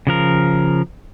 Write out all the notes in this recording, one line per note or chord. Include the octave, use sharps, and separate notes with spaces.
C#3 F3 A#4